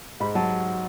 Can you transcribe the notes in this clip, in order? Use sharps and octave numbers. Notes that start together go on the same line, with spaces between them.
G#2 B5
F#3 A5